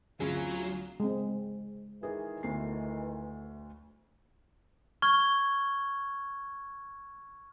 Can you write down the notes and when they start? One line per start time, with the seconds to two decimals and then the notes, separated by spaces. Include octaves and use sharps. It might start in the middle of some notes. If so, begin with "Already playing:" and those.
0.20 D2 E3 F#3 C4 C#4 F4 G#4
1.00 G#3 C4
2.03 D#3 E3 G#4
2.43 D2 A3 C7
5.02 C#6 F6 G#6 G7